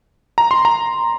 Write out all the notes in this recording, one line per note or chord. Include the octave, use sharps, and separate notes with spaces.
A#5
C6
A#5